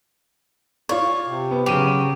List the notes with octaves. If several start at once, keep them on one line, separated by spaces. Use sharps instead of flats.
F4 C#5 D5
C3
B3
C#3 F#3 G4 D#7 F7